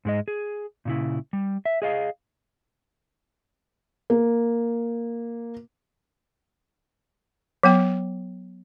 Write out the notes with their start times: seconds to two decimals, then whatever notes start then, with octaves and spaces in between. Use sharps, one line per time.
0.05 G#2 G#3 D#5
0.28 G#4
0.85 A#2 C#3 E4
1.33 G3
1.65 E5
1.82 G#4 D#5 F5
4.10 A#3
7.63 F#3 B3 G5